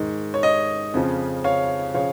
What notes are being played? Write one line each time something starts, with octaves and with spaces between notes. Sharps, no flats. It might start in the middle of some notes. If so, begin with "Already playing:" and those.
Already playing: G#2 D#3
C#5
D#5
F2 C#3 F3
C#5 F5
C#3 F3 C#5 F5